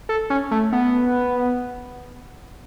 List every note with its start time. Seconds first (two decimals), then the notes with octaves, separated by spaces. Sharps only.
0.09 A4
0.30 C#4
0.51 A3
0.72 B3